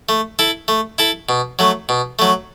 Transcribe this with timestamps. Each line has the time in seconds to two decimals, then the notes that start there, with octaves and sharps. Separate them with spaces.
0.09 A3
0.39 E4 A4
0.68 A3
0.98 E4 A4
1.29 B2
1.59 F#3 A3
1.89 B2
2.19 F#3 A3